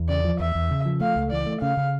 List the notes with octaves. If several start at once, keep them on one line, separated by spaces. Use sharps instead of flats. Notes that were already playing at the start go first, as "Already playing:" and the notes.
Already playing: E2
C#3 D5
F3
E2 E5
E2
C#3
F3
A3 F5
C#2
E3 D5
A3
C#3 F5
C#3